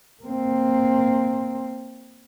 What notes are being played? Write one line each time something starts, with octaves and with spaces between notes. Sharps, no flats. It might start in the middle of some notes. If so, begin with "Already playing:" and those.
A#3 C4